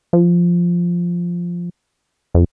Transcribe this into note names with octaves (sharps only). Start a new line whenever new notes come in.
F3
F2